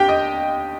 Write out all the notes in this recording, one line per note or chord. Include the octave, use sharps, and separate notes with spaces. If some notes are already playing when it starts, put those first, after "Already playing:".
Already playing: D#2 D3 G4 G5
D#5